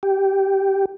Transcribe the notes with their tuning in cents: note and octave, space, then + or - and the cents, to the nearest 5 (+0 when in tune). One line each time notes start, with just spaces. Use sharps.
G4 -10